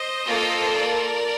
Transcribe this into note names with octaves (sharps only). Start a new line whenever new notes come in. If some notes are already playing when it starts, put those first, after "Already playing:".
Already playing: C5 D#5
A#3 F4 A4
A#4 D5